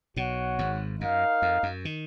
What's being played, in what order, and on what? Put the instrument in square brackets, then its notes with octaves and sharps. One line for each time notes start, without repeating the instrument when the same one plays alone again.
[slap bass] B1 B2 [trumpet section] F#4 C#5 F#5
[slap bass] G#1 G#2
[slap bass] F#2 [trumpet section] D#4 A#4 F5
[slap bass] F2
F#2
D#3